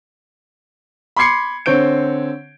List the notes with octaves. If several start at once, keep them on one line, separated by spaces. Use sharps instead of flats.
B5 C6 D6 G#6 C7 C#7
D3 C4 C#5 G6 D7